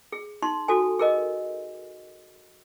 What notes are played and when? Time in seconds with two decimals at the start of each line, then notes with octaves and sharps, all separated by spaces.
0.12 G#4
0.42 D#4 C6
0.68 F#4 A4 G#5
0.99 G#4 A#4 D#5